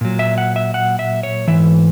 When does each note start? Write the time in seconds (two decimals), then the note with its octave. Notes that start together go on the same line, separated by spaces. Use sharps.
0.01 A#2 F#3
0.19 E5
0.38 F#5
0.56 E5
0.74 F#5
0.99 E5
1.23 C#5
1.48 G#2 E3 E5